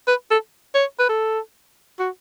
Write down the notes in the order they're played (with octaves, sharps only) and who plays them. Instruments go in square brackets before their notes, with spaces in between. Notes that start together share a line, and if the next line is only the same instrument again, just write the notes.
[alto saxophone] B4
A4
C#5
B4
A4
F#4